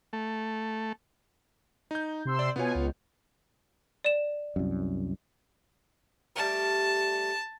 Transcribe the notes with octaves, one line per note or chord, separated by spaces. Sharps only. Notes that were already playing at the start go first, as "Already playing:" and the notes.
A3
D#4 G6
C3 C6 E6
D5
B2 B3 F4 C#5 G#5
C#2
D5 E7
C2 F#2
G3 A3 A#4 A5